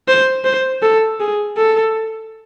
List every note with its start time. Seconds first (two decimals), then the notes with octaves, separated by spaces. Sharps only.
0.08 C5
0.45 C5
0.82 A4
1.20 G#4
1.57 A4